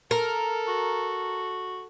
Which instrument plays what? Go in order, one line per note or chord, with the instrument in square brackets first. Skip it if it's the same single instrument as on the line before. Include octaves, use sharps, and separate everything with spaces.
[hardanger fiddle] A4 [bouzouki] A#4
[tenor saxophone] F#4